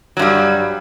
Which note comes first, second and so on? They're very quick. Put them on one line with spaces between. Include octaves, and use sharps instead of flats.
F#3 G2 G3